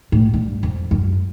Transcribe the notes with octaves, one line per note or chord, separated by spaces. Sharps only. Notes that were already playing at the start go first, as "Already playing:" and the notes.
A2
G2
F2
F#2